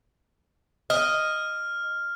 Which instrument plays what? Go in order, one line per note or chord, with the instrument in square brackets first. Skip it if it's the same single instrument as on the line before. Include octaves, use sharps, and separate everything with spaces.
[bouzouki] D#5 [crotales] F6